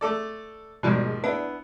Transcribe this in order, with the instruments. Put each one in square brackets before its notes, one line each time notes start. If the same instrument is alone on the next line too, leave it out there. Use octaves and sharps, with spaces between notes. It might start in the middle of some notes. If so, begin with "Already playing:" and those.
[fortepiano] A3 A4 D5
[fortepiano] D#2 G#2 F3 [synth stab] B2 G3 G#3
[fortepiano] B3 E4 [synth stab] D4